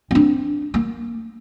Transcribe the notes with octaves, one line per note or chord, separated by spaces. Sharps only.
C4 D4
A#3